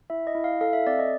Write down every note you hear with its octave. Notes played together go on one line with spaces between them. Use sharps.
E4 E5
D#5
E4
F5
A4 F5
E5
C4 D5
D#5